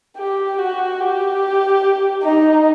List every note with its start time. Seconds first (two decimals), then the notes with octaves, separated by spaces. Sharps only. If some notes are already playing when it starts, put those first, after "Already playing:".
0.18 G4
0.59 F#4
1.00 G4
2.23 D#4